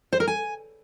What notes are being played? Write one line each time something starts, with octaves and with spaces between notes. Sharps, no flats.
C5
A#4
G#5